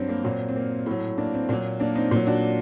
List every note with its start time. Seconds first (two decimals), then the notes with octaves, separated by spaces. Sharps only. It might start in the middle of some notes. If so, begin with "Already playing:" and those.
Already playing: G2 F#3 C4
0.09 A#3
0.24 A#2 F#3 C4
0.49 C4
0.56 A#3
0.86 A2 F#3
1.18 A#3 D4
1.34 C4
1.49 A#2 A#3
1.52 F#3
1.80 A#3 D4
1.95 C4 D#4
2.11 A#2 F#3
2.27 D4 F#4